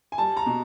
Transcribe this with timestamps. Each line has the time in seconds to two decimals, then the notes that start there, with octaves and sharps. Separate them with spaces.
0.12 G#5
0.18 G3 A5
0.37 A#5
0.46 B2